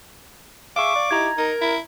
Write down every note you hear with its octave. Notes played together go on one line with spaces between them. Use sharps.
G#4 E5 F5 C#6 D6
D5
D#4 E4 G4 A#5 G#6
D#4 A#4
E4